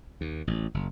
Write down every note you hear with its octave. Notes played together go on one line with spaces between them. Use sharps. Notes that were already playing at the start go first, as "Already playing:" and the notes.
D#2
A1
F#1